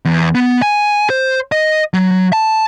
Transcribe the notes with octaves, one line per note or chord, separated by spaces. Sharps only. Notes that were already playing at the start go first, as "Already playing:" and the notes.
E2
B3
G#5
C5
D#5
F#3
A5